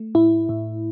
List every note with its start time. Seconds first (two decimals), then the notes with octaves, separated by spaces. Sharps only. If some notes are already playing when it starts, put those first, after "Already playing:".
Already playing: A3
0.15 A2 E4
0.49 A2